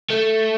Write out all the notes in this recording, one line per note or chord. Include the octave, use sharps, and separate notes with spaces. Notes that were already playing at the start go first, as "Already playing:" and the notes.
A3